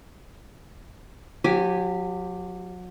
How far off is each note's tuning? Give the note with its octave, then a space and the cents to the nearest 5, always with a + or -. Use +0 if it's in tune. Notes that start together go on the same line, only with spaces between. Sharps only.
F#3 -35 G4 +0 G#5 -5